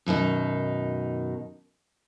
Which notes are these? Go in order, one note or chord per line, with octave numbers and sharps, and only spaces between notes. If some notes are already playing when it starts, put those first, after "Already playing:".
F#2 B2 D#3 D#4